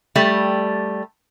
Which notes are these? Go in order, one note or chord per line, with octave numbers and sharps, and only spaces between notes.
G3 A3